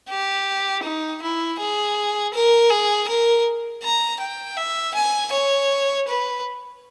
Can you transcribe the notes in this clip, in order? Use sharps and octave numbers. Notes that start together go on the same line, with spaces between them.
G4
D#4
E4
G#4
A#4
G#4
A#4
A#5
G5
E5
G#5
C#5
B4